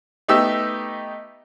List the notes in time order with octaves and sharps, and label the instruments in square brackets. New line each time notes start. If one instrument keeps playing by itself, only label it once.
[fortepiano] A3 B3 D#4 G4 E6